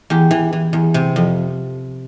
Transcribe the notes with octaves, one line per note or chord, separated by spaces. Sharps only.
E2 G4
E3
E3
E2
C3
F2